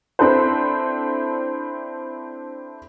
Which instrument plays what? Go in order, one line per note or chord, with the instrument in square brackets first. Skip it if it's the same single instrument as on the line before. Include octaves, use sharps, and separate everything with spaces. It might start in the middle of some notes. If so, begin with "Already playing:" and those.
[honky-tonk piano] C4 D4 E4 A4 B4 C5